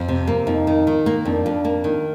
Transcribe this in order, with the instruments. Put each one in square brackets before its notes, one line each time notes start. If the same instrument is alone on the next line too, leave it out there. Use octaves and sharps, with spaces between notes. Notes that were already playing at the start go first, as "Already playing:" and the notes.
Already playing: [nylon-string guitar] F2
C3
A#3
[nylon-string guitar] F2 [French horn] D#4
[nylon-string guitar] D#3
D#3
A#3
[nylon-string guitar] F2 [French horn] D4
[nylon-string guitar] F2
A#3
D#3